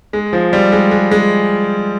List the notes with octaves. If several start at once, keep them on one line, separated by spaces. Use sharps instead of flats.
G#3
F3
G3
G#3
G#3
G#3